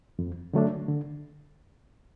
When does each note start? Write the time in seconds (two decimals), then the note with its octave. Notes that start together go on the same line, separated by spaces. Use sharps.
0.19 F2
0.53 D3 F#3 A3 D4
0.88 D3